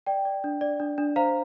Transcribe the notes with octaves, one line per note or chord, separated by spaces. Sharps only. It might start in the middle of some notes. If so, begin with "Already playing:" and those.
D5 G5
D5
D4
D5
D4
D4
C5 F5 A#5